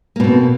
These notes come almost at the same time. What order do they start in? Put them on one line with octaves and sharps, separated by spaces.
A#3 B2 C4